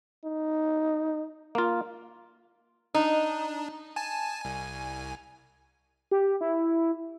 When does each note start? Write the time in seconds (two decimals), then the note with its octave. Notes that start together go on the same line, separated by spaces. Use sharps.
0.24 D#4
1.55 A#3 F4
2.95 D4 D#4
3.96 G#5 A5
4.42 C2 G#5
6.11 G4
6.41 E4